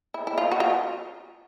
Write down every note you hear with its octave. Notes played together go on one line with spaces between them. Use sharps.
E4
E4
F4
F#4
F4